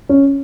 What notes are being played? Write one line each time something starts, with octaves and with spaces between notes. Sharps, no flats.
C#4